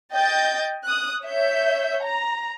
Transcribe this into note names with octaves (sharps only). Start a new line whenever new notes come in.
D#5 G5 G6 A6
D#6 F#6
C#5 E5 G6
A#5